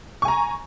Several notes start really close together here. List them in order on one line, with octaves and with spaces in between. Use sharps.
C#6 G#5 A#5